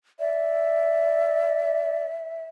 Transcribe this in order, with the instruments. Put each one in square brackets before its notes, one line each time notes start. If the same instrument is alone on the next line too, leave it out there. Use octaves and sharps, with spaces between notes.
[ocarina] D5 [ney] E5